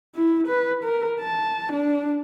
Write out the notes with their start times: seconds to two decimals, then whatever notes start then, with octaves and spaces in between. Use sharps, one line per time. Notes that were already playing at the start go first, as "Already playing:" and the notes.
0.15 E4
0.47 B4
0.84 A#4
1.21 A5
1.73 D4